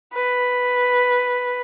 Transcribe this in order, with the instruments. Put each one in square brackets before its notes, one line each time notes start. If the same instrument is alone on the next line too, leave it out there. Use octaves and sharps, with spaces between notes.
[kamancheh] B4